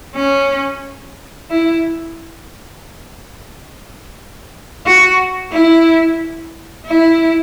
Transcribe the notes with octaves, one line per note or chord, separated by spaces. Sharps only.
C#4
E4
F#4
E4
E4